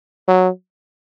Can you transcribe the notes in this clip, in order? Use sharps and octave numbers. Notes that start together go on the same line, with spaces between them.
F#3